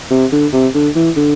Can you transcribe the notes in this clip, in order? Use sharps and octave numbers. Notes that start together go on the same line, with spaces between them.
C3
D3
C3
D3
E3
D3